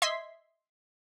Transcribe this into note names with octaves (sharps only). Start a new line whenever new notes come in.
D#5 E5 C6 G#6 B6